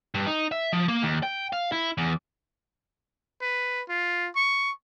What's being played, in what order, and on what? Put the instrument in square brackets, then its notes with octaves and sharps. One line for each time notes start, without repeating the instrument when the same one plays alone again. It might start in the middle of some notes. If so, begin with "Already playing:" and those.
[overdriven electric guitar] G2
D#4
E5
F3
A#3
D#2
G5
F5
E4
E2
[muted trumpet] B4
F4
C#6